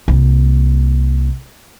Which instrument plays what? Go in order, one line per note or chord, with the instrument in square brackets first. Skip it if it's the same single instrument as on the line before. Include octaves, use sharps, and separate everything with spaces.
[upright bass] C2 A#3